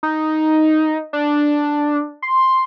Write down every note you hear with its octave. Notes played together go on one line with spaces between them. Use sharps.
D#4
D4
C6